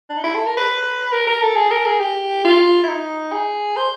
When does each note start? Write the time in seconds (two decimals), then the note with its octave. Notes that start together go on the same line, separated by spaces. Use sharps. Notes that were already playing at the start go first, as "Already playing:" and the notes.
0.10 D4
0.17 D#4
0.24 E4
0.35 A4
0.46 A#4
0.57 B4
1.12 A#4
1.27 A#4
1.42 A4
1.56 G#4
1.71 A#4
1.86 G#4
2.00 G4
2.45 F4
2.84 E4
2.88 D#4
3.32 G#4
3.77 C5